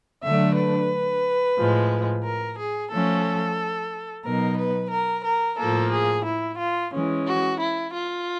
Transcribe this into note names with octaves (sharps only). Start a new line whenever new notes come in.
D3 F#3 A3 D4 E5
B4
A2 F3 G#3
A#4
G#4
F3 A3 C#4 A4
B2 F#3 B3 D#4 A#4
B4
A#4
A#4
A2 F3 A#3 A4
G#4
E4
F4
E3 G#3 C#4
F#4
E4
F4